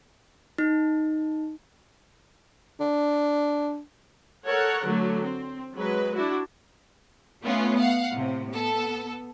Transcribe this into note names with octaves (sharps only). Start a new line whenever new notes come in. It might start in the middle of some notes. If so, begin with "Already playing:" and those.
D#4
D4
A4 A#4 C#5 F#5
D3 F#3 A3
C4
F#3 G#3 B4
D4 E4 F#4
A3 B3 C#4 F4
F5 F#5
A2 C3
B3 A4